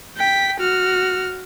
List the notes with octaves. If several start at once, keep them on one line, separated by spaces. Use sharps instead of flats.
G5 B6
F#4 F6